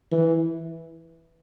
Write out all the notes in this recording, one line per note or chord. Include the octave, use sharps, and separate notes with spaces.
E3